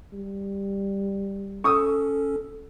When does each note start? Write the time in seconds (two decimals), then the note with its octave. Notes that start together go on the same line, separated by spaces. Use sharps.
0.13 G3
1.64 C#4 A4 C#6 D#6 E6